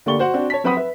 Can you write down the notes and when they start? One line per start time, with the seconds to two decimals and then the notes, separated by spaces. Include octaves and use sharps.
0.06 D3 A#3 G4 D5 C#6 G7
0.19 F#4 C5 F#5
0.34 C4 D4 F#4
0.50 C#5 A5 B6
0.64 F#3 C4 B4 F#5 B5 D#6
0.76 B4 E5